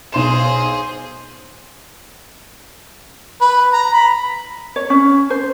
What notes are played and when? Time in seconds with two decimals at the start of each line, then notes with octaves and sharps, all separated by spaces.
0.12 B1 G#4 C5 C6 E7
3.41 B4
3.73 A#5
3.94 B5
4.76 C#5
4.90 C#4
5.30 C5